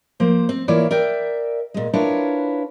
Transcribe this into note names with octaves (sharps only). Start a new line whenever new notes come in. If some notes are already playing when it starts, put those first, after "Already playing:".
F3 A#3 C5
C4
E3 A#3 E4 F4 C#5 D5
A#4 D5 E5 G5
A#2 G#3
D4 E4 F4 A#4 B4 C#5